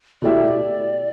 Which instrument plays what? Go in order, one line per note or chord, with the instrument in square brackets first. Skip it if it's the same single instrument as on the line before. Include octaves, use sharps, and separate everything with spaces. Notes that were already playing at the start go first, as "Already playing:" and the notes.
[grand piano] B2 A3 E4 G4 E5 [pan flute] D5